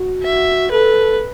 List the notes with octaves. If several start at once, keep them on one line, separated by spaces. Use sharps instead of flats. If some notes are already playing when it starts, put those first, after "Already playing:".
Already playing: F#4
E5
A4 B4